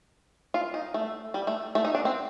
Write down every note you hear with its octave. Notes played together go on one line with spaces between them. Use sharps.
F4
D#4
A3
G3
A3
A3
D#4
D4
C4